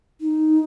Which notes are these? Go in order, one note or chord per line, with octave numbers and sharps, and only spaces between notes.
D#4